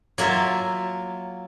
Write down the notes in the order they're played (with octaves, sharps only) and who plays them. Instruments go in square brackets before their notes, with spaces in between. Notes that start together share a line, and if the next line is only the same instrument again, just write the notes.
[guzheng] F#3 A#3 F4 E5 A5